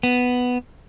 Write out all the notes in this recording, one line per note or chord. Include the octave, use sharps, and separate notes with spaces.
B3